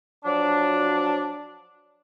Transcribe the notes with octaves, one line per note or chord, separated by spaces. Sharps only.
F3 F#3 D4